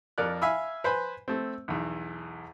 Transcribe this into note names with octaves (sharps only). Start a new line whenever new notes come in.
F2 A#4 D5 F#6
E5 F5 G#5 B5 E6
B4 C5 G#5 B5
A3 C4
B1 E2